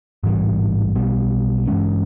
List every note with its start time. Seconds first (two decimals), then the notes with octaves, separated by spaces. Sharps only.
0.24 A1 G#2 E3 G3
0.95 B1 B2 G3
1.67 G2 E3 G#3 C#4